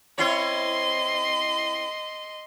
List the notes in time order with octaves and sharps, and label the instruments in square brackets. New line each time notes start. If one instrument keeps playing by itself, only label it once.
[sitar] C4 E4 C#5 [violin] D#5 C6